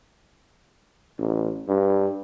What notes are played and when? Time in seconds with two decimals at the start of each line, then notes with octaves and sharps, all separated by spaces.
1.19 A1
1.68 G2